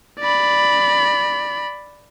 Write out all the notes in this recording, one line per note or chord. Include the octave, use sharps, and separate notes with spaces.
D5 B5